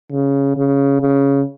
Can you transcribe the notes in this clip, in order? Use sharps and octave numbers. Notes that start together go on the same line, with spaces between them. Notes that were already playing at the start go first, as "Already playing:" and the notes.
C#3
C#3
C#3